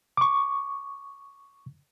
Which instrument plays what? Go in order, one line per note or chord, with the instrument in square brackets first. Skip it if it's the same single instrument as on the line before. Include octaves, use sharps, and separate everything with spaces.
[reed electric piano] C#6 D6